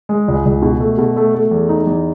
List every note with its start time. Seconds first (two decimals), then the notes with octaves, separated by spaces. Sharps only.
0.09 G#3
0.28 C#2
0.46 C#2
0.62 B2
0.80 A3
0.98 B2
1.17 A3
1.34 A3
1.51 E2
1.69 D#4
1.87 E2